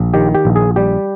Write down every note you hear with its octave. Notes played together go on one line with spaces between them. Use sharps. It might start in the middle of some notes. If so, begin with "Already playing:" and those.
Already playing: A#1
D#3 G4
G4
A#1
G#4
G3 G4